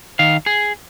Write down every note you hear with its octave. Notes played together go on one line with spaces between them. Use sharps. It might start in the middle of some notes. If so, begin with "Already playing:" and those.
D#3 F5
G#4